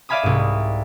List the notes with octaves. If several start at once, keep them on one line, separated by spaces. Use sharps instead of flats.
D5 E5 F5 G#5 B5 D#6
C2 G#2